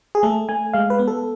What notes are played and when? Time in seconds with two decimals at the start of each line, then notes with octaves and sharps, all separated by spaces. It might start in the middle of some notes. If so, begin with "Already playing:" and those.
0.15 G#4
0.23 A3 A4
0.49 A3 G#5
0.73 G#3 F5
0.90 B4
0.99 B3
1.07 A4